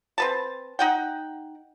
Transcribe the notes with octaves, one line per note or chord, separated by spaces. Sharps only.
C4 B4 A5
D#4 F#5 G5